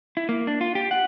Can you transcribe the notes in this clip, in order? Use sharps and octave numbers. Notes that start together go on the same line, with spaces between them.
E4
A#3
D4
F4
G4
F#5